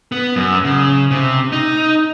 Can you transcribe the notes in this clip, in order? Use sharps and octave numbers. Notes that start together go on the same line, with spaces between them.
B3
F#2
C#3
C3
D#4